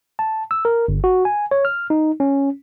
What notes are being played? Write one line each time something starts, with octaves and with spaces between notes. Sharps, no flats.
A5
E6
A#4
G1
F#4
G#5
C#5
F6
D#4
C#4